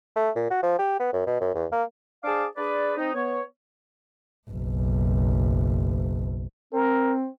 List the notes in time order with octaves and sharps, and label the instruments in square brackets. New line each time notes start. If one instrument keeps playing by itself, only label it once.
[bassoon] A3
A#2
F#4
F3
G4
B3
F#2
B2
F#2
E2
A#3
[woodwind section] D4 G#4 C5 F5 A5 D6
D4 G#4 B4 D5
C4 D#4
B3 C#5
[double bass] F#1 B1
[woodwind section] C4 [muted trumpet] A#4